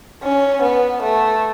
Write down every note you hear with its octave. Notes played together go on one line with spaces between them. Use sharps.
C#4
B3
A3